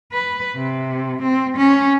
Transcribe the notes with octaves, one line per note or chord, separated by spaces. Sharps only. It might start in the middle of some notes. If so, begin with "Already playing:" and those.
B4
C3
C4
C#4